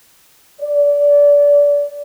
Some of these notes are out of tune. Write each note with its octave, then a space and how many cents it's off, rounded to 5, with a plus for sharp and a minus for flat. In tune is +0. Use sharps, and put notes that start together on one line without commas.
D5 -25